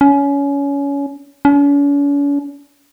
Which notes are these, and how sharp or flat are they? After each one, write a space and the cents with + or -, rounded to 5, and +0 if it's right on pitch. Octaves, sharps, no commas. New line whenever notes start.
C#4 +25
C#4 +45